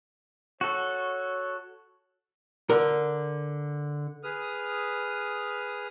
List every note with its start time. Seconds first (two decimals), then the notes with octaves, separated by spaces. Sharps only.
0.61 F#4 A4 C#5
2.70 D3 A#4
4.23 G#4 B4 D#6 F6